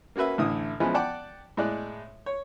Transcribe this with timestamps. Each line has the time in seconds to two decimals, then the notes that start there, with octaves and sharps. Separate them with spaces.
0.16 A#3 C#4 F#4 B4 E5
0.38 A1 A2 D3 E4 D#6
0.80 E3 F3 G#3 B3 C#4 E4
0.94 D5 F#5 G5 A5 D6
1.57 A2 G#3 D5 F#6
2.26 C#5